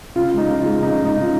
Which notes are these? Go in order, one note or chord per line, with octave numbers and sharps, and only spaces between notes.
C#3 F4
G#3 D#4
C#3
F4
G#3
C#3 D#4
G#3 D#4
C#3 F4